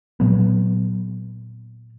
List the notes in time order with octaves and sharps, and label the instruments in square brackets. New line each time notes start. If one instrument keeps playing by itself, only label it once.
[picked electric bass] A#2 F#3 B3